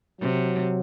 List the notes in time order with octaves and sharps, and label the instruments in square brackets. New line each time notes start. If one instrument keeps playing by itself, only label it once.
[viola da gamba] C3 [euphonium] F#3